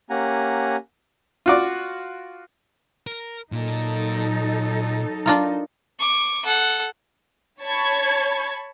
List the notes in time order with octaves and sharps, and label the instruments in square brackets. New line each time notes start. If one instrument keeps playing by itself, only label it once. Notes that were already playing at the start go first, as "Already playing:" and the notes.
[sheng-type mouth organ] A#3 C#4 G4 F#5 G#5 A#5
[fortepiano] F4 F#4 D5
[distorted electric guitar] A#4
[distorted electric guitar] A#2 [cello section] F#3 D#4 A4
[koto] D4 F4 A#4
[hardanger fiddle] C#6 D6
A4 F#5
[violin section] C#5 A5 B5 C#6 G#6